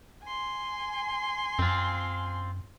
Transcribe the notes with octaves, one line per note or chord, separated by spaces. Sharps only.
G#5 C6
F#2 C4 F4